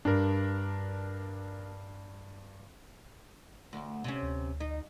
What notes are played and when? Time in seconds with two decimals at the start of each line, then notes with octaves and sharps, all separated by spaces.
0.05 G2 D4 A#4
3.73 D2
4.04 C3 C#4
4.23 D2
4.60 D#4